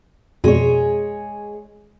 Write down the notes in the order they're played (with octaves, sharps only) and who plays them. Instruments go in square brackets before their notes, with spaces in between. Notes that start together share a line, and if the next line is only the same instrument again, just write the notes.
[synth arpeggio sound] F2 B2 [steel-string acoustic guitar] G#3 G#4 C#5